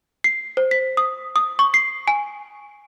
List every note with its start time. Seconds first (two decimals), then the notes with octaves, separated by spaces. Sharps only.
0.24 C7
0.57 C5
0.71 B6
0.97 D#6
1.36 D#6
1.59 C#6
1.74 C7
2.08 G#5